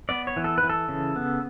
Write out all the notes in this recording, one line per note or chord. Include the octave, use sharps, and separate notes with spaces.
B3 D5
C#5
E3
A4
B4
E3
A4
C#3
B3